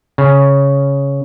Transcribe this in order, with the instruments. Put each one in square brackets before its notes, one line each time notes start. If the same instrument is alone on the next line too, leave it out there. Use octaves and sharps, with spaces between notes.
[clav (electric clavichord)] C#3